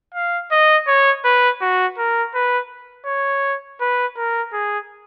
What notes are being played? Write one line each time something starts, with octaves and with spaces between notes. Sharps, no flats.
F5
D#5
C#5
B4
F#4
A#4
B4
C#5
B4
A#4
G#4